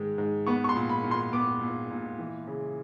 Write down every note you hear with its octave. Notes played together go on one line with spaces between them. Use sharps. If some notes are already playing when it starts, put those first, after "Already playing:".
Already playing: G#2 D#3 G#3
G#2
B3 C#6
C#6
C6
A#2
B5
A#2
C6
B3 D6
A#2
A#2
E3
C#3